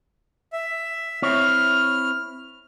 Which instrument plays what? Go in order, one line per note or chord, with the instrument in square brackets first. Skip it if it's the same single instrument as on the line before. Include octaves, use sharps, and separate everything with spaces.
[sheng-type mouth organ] E5
[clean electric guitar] C4 E4 C#5 [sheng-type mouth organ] F6